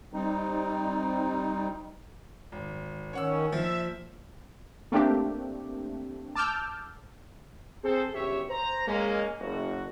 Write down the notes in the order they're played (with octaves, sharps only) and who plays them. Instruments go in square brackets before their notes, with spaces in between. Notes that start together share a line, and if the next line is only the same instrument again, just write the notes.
[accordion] G3 C4 D#4
[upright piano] G#1
[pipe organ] D#3 C#4 [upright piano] C#5 F#5 E6
[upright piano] A#2 F3 [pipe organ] E5
[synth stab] A3 A#3 C4 D4 G4
A5 D6 E6 F6 G6
[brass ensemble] C4 G#4 A4 C5
G1 F#2 C#3 G4 C#5 E5
C5 A#5
G#3 A#3 C#4
F#1 F#4